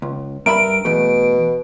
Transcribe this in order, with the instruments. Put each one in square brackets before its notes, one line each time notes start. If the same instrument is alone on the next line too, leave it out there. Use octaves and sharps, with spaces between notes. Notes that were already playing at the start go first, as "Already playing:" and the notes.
[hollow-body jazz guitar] C#2
[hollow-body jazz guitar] G2 E5 B5 [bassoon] A#4 [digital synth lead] D7
[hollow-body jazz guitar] E2 A3 [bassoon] B2